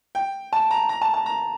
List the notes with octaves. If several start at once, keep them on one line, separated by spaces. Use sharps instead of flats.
G5
A5
A#5
A#5
A5
A5
A#5